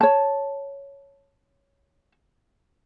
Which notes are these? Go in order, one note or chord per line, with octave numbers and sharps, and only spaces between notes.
C#5 A5